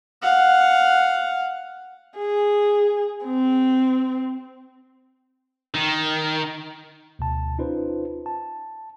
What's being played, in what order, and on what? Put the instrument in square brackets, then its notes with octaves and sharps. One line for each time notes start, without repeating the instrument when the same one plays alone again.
[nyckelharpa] F5 F#5
[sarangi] G#4
C4
[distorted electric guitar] D#3
[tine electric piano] D2 B2 A5
C#4 D#4 F4 B4 C5
A5